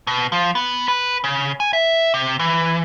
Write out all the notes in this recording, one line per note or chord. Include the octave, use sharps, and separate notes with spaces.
B2
F3
B3
B4
C#3
G#5
E5
C3
E3